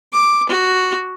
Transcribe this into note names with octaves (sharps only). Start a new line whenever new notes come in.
D6
F#4